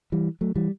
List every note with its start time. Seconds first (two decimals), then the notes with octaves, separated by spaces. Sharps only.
0.12 E3 G3
0.41 F#3 A3
0.56 E3 G3